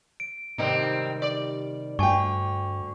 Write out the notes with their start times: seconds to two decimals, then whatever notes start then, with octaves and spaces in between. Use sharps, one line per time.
0.20 D7
0.58 G#2 C3 D#3 G3 C4 D#4
1.22 D5
1.99 D2 G2 D3 G5 G#5 C#6